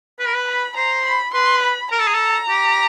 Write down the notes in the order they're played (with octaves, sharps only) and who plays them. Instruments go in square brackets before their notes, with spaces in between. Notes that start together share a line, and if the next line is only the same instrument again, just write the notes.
[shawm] B4 [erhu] B5
[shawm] A#4
B4
[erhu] B5
[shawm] C5 [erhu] A#5
[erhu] B5
[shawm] B4 [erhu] C6
[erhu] B5
[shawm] A#4 [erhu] A#5
[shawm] A4
G#4
A4
G4